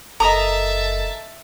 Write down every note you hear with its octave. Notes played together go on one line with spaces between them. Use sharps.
F#1 A4 A#4 D#5 E5 A5 A#5 D#6